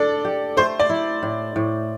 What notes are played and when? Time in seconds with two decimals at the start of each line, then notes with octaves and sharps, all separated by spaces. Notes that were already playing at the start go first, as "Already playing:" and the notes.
Already playing: D4 A4 D5
0.25 G4
0.57 A3 C5
0.80 D5
0.90 E4
1.23 A2
1.56 A2